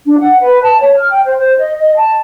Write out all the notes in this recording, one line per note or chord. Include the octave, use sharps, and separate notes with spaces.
D4
F#5
B4
A5
C#5
F6
G5
C5
C5
D#5
D#5
A5